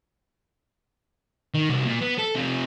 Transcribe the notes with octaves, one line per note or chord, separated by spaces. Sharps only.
D#3
C2 F#4
A#2
B3
A4
C3 F4